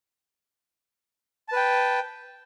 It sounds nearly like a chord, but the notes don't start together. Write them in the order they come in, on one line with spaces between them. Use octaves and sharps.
A5 B4 G5